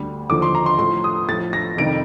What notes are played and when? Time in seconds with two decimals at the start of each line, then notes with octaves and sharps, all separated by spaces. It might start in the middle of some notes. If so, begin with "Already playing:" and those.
Already playing: D2 D3 G3
0.29 D#2 D3 F3 D6
0.42 C6
0.55 A#5
0.66 C6
0.78 A2 F3 C6
1.04 D#6
1.28 A2 F3 A6
1.53 A#6
1.77 F2 C3 D#3 G3 D7